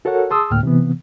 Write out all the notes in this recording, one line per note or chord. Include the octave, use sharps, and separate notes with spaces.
F#4 A4 A#4 C#5 F#5
G#4 A5 C6 D#6 E6
D2 A2 A#3 G5 F6
C3 E3 B3